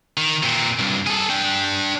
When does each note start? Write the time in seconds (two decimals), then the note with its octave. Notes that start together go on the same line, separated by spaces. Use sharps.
0.17 D#3
0.43 A#2 C4
0.79 C2 G2
1.07 G#4 A4
1.30 D4 G5